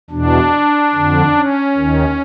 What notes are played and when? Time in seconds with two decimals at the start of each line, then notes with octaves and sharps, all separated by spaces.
0.10 E2 B2 D4
0.93 F2 D3
1.35 C#4
1.76 D#2 D#3